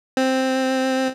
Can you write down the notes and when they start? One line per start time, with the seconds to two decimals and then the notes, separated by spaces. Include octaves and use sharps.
0.17 C4